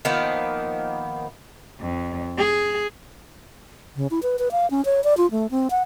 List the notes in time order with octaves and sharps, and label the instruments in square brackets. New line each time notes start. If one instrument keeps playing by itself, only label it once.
[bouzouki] D#3 F3 A#3 B3
[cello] F2
G#4
[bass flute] C#3
E4
B4
B4
F5
C#4
C#5
D5
F4
A3
C4
F#5